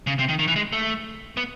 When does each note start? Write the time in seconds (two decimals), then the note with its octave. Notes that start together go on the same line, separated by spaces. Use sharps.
0.07 C#3
0.19 C3
0.29 D#3
0.39 D#3
0.48 E3
0.56 G#3
0.72 A3
1.37 B3